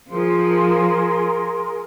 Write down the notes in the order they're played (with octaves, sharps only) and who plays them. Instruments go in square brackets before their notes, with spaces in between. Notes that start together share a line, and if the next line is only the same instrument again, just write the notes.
[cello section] F3 [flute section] G#4 A#4 C6